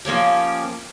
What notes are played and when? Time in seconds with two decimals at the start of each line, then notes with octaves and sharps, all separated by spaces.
0.05 F3 A#3 C#4 G4